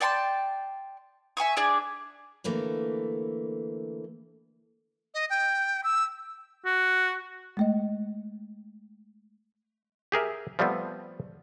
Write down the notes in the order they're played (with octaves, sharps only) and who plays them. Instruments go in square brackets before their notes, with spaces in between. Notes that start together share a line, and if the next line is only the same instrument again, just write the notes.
[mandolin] D5 G5 A5 C6
E5 G#5 C#6 D#6
D4 G#4 D5
[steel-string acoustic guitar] D3 E3 A3 A#3
[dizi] D#5
G5
E6
[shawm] F#4
[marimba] G#3 A3 D#5
[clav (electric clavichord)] G4 G#4 A#4 E5
F3 G3 A3 B3 C4